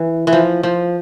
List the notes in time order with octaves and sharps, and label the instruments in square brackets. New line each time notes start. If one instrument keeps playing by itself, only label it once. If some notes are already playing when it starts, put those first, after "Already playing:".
Already playing: [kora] E3
E3
F3
F3